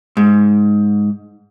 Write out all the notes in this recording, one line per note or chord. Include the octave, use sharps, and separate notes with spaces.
G#2